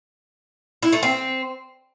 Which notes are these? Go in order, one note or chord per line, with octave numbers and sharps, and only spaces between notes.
E4
A3
C4